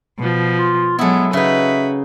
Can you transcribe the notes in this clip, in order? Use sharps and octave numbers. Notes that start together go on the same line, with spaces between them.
B2 F3
F4
F#3 G#3 B3 E4 A4
C#3 D#4 F#4 B4 E5